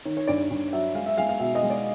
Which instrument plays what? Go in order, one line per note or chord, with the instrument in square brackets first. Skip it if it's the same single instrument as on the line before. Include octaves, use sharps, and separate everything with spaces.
[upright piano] D#3 C#5
C#5
G2 D5
D5
G2
F#3 E5
G#3 F5
E5
G#3 F5
F5
B2 E5
D#5
G#3
D5